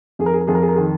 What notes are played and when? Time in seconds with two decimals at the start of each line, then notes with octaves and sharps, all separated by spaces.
0.19 F2 G#4
0.26 A#4
0.33 G#4
0.41 A#4
0.47 F2 G#4
0.55 A#4
0.62 G#4
0.69 A#4
0.75 D#3 G#4